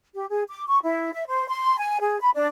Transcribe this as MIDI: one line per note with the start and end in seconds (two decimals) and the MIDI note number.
0.15 0.25 67
0.29 0.43 68
0.48 0.64 86
0.67 0.78 85
0.82 1.11 64
1.13 1.25 76
1.27 1.46 72
1.48 1.77 84
1.78 2.00 80
2.00 2.19 68
2.20 2.30 83
2.34 2.46 62